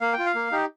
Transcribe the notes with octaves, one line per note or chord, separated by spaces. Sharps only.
A#3 F5
G5
F4
F5
A#3
D#4 G4